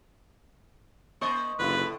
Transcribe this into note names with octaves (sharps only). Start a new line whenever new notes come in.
A#3 C5 D#5 C#6
F#1 A2 D3 E4 B4